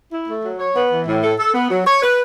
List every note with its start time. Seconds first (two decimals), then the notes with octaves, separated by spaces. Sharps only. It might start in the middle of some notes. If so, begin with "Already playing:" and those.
0.12 E4
0.28 A3
0.43 F#3
0.59 C#5
0.75 B3
0.91 E3
1.07 A2
1.23 A4
1.39 A4
1.54 B3
1.71 F#3
1.87 C#5
2.02 B4